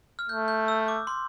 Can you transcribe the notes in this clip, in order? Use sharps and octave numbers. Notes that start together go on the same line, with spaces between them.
F6
A3 G6
G6
E6
D6
C6